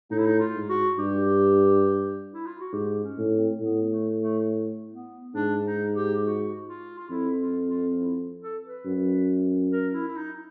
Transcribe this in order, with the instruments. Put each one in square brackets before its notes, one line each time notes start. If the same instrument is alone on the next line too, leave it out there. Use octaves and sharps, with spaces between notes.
[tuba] A2 [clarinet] D#4
[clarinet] E4
D#4
F4
[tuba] G#2
[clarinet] F#4
[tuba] G2 [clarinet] G4
[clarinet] E4
F4
F#4
[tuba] G#2 [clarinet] G4
[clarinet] C#4
[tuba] A2
[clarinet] C4
[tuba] A2 [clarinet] B3
[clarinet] A3
A3
B3
[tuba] G#2 [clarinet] D4
[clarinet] D#4
G4
F#4
F4
F4
[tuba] F2 [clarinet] E4
[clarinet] F4
F4
E4
A4
B4
[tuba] F#2
[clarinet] A#4
E4
E4
D#4